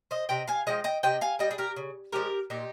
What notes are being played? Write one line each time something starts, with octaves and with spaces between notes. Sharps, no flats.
C5 D#5
C3 D#5 G5
F5 G#5
F3 G#3 D#5 G5
D#5 G5
C3 D#5 G5
F5 G#5
G3 D#5 G5
G#4
G4 A#4
C#3
F3 G#3 G4 A#4
A#2 D#4 G4